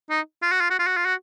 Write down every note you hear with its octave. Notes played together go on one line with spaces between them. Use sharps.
D#4
F4
F#4
F4
F#4
F4
F#4
F4
F#4